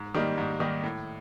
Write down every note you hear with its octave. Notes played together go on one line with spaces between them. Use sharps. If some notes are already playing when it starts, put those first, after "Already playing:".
Already playing: G#2
D#3 G3 A#3 D#4
G#2
D#3 G3 A#3 D#4
A2